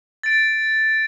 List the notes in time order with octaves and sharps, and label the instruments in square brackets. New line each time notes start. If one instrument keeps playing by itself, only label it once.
[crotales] A6 D7